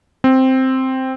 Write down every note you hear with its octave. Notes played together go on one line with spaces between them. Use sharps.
C4